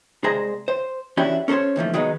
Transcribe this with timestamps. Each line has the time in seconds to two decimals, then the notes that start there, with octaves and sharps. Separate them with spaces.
0.24 C2 G#3 G#4 C5 A#5
0.68 C5
1.17 E3 C#4 D4 E4 F#4 G4
1.48 C#4 A4 A#4 C5 C#5
1.76 D#2 E3 F3 A3
1.94 D#3 F#3 G#3 B3 D#4